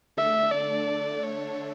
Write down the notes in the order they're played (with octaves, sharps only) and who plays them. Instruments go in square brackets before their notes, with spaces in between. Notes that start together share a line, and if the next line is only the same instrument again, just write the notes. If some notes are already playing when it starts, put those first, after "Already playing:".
[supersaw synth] D3 A3 D4 A4 [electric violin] E5
[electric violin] D5
C#5